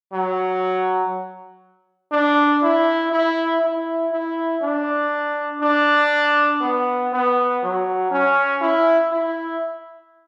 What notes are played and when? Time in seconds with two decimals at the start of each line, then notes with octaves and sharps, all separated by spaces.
0.13 F#3
2.12 D4
2.63 E4
3.12 E4
3.62 E4
4.12 E4
4.63 D4
5.61 D4
6.61 B3
7.12 B3
7.62 F#3
8.11 C#4
8.61 E4
9.11 E4